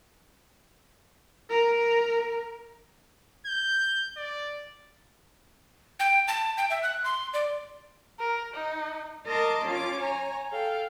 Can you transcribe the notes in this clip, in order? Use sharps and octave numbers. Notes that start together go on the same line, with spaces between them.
A#4
G6
D5
G5
A5
G5
E5
F#6
C6
D5
A#4
D#4
A#4 D#5 A5 C6 D6
C#4 F4 D6
C#5 G#5 A#5
A4 F5 G5